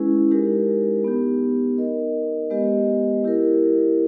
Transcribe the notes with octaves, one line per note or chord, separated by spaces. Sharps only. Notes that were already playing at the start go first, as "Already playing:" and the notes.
Already playing: G#3 C#4 E4 G#4 B4
G#3 D#4 G4 A#4
B3 D#4 G4
D#4 A#4 D#5
G#3 B3 G4 B4 D#5
E4 G4 A#4